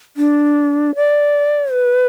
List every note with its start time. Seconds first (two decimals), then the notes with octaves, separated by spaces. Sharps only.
0.17 D4
0.95 D5
1.73 B4